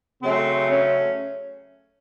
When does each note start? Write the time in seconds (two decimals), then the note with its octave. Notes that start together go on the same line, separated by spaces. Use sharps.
0.21 C#3 F#3 A3 C4
0.69 C#4